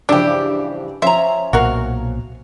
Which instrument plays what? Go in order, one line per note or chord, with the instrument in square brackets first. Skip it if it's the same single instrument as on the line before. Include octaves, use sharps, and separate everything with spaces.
[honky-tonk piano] G2 C#3 F3 [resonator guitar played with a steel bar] E3 [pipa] D4 G4
[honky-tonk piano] F3 C#4 [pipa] C5 [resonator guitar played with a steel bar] E5 A#5
[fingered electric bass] B1 A#2 [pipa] F#4 A#4 F5